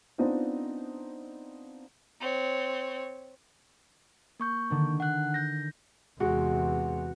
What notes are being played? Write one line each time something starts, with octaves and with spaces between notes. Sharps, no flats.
B3 C4 D4 D#4 F4 C5
C4 C#5
A#3 C#6 G6
D3 D#3 D4
F#5 F#6
G6 A#6
E2 C3 G#3 F#4